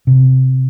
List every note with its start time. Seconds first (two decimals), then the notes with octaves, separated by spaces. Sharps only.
0.07 C3